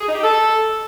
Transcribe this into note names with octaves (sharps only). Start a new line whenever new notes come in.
G#4
D#4
G4
A4